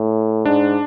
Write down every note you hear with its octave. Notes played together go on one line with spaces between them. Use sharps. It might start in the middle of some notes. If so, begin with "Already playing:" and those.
Already playing: A2
G#2 D4